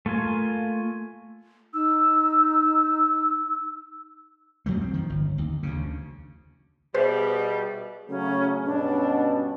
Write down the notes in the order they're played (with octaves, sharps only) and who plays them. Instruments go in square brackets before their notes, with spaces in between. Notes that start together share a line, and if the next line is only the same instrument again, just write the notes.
[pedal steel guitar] A3 A#3 F4 G#5
[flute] D#4 [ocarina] E6
[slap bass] F2 F3 F#3 A3
C4
D#3 F3
G1
D#2
D2 C#3
[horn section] B2 G3 [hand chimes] G#4 E5 [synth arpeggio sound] B4 C5
[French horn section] C#3 F#3 A3 [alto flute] C#4
[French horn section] G2 B2 C#4 [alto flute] D4